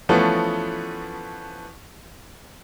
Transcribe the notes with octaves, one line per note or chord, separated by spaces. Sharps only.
E3 F3 A3 B3 C#4